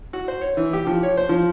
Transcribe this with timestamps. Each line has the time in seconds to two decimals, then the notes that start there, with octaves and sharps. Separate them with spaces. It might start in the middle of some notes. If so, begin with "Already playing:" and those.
0.13 F#4
0.28 C5
0.41 C#5
0.57 E3
0.73 G4
0.87 F3
1.03 C#5
1.17 C5
1.29 F3